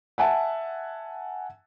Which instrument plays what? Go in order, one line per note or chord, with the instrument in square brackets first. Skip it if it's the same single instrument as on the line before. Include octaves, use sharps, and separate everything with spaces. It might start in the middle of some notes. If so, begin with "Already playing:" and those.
[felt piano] E5 F#5 G#5 A5